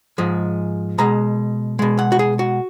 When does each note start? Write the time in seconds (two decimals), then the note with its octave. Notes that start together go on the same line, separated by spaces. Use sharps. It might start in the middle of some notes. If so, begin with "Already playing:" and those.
0.18 G#2 F3 G#3
0.98 B2 G#3 A#5
1.79 B2 G#3
1.99 F#5
2.12 F#4
2.19 G#4
2.39 F#4